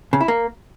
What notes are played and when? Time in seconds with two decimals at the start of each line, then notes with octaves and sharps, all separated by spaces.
0.13 C#3
0.21 E4
0.28 A#3